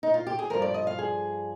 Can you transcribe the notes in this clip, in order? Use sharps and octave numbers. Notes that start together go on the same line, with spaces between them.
D#4
F4
G4
G#4
G2 F3 A#4
D5
D#5
F5
G#4